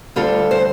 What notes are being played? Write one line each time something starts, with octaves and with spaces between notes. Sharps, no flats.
D2 D3 G3 F4 A4
C5